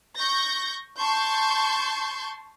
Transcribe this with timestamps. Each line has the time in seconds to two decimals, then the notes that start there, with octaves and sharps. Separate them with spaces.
0.18 C#6 G6 A#6
0.99 A5 C6 C#6 G6